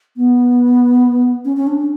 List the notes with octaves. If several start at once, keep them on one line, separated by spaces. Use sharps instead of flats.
B3
C#4
C#4
D4